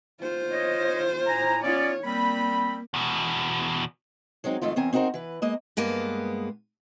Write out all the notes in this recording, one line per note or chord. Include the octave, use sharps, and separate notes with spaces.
F4 C5
C#5 D#5
A2 G#5 A#5
B3 C#4 F4 C#5 D5
G3 A#3 C4 B5
E2 B2
F#3 G#3 C4 D#4
F2 G#2 D#3 A3 F4
E2 C4 A#4 G#5
C4 D#4 F#4 A#4 C5
E3 B4
G#3 A#3 D#5
G2 G#3 A#3 B3